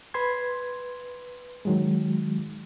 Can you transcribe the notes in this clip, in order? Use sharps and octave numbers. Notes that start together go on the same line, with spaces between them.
B4 B5 C6 G#6
D#3 F#3 G#3